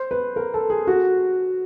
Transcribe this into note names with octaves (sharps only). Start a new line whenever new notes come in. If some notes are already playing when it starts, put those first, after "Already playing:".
Already playing: C5
B4
A#4
A4
G#4
F#4